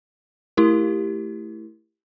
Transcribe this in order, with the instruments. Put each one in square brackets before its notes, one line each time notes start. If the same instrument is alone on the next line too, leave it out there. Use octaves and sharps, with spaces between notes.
[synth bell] A3 E4 G4 A#4